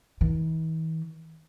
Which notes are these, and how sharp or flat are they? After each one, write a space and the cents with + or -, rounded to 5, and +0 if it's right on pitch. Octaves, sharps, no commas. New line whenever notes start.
E3 -45